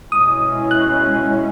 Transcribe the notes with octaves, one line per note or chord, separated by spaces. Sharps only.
B2 G#3 C#4 E4 D#6
F#6